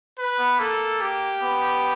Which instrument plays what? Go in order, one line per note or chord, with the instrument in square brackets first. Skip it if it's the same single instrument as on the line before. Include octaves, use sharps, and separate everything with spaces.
[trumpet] B4
[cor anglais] B3
[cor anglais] A#3 [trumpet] A4
[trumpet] G4
[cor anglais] B3